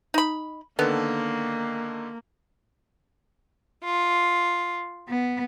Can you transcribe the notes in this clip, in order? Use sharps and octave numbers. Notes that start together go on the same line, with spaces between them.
D#4 B5
D3 D#3 A#3 B3 A4
F4
B3